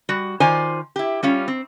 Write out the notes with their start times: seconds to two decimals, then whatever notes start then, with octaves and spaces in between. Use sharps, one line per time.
0.09 G3 F#4
0.40 D#3 F4 C5 D5 G#5
0.96 E4 G4
1.23 G3 C#4 F4
1.48 C4